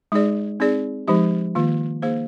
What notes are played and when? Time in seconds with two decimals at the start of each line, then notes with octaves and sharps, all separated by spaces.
0.12 G#3 D#4 G#4 D5
0.60 C4 D#4 G#4 D5
1.08 F3 G#3 D#4 G4
1.55 D#3 A#3 F4
2.02 A#3 D#4 G#4 C5